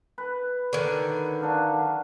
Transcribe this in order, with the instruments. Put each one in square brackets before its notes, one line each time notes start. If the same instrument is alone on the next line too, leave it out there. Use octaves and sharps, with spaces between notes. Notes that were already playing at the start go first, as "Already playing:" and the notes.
[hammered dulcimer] B4
[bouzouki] D3 D#3 [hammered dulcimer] C#5
[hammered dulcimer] F#3 D4 F5